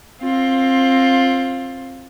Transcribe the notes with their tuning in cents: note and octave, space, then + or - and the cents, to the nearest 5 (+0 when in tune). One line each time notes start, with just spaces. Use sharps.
C4 +20 F4 +10